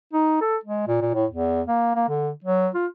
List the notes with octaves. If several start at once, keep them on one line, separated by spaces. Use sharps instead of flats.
D#4
A4
G#3
A#2
A#2
A2
E2
A#3
A#3
D3
F#3
F4